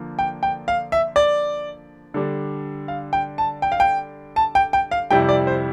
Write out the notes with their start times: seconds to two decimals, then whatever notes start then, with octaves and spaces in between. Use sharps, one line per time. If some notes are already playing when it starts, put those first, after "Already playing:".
Already playing: D3 F3 A#3
0.19 G5
0.43 G5
0.68 F5
0.92 E5
1.16 D5
2.14 D3 G3 D4
2.88 F5
3.13 G5
3.38 A5
3.62 G5
3.72 F5
3.80 G5
4.36 A5
4.55 G5
4.73 G5
4.91 F5
5.10 F2 C3 G3 C4 E4 G5
5.29 D5
5.47 C5